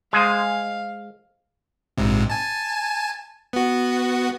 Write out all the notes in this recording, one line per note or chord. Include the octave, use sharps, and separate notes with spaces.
G#3 G#4 C5 F5
A#1 G#2 C3
G#5 A5
B3 F#4